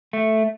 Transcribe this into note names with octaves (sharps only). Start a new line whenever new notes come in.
A3